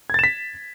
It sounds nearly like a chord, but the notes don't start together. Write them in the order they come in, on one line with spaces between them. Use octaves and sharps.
G#6 A6 E7 B6